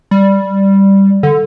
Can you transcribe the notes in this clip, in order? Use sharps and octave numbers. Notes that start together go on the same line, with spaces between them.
G3
D3